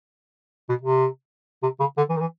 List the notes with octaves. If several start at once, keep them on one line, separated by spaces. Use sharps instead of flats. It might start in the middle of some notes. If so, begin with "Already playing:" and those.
B2
C3
C3
C#3
D3
E3
D#3
E3